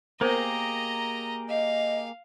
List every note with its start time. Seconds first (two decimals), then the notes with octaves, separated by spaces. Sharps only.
0.21 A#3 B3 G4 G#4 A#4 C5 D#5 A#5
1.49 D#5 F5